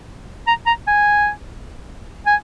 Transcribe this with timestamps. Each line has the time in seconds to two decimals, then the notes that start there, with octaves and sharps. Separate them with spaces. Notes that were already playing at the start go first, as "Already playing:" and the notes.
0.47 A#5
0.66 A#5
0.87 G#5
2.26 G#5